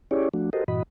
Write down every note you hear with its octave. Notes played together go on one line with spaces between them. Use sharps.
C#4 E4 G4 G#4 C#5 D5
F3 A3 D4 F#4
F#4 G4 A4 A#4 C5 D#5
G2 A#2 E3 F#4 D#5 B5